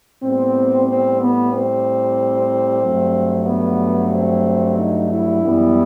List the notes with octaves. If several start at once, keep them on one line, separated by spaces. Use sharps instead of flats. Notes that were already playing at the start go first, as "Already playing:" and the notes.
A2 G3 B3 C4
C4
B3
C4
G2 F#3 A3
B3
C4
D#4
E4
F#2 E3 G3 B3